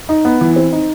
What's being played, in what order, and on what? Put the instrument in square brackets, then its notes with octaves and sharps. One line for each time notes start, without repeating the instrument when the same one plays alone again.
[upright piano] D#4
B3
E3
C4
D#4